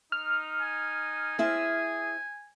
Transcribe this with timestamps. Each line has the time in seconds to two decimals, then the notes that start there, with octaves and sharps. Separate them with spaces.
0.12 D#4 F6
0.62 G#5
1.39 C4 E4 G#4 E5